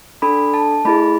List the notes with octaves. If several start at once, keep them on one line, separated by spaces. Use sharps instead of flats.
D4 A4 B5
A5
A3 E4 G#4 B5